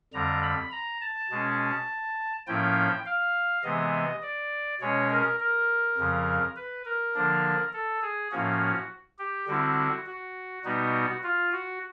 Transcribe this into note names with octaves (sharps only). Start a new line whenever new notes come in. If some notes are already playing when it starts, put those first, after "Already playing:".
F2 D3 G3 A#5
B5
A#5
A5
B2 G#3 C#4
A2 F3 A#3 C#4 E4 G5
F5
C3 E3 G#3 B3 D#5
D5
B2 G#3 C#4 C#5
A#4
A#4
F2 C#3 F3
B4
A#4
D3 F3 A#3 D4
A4
G#4
A2 F3 A#3 C#4 F#4
G4
D3 G3 C4 E4 F#4
F#4
B2 G3 B3 D#4 F#4
F4
F#4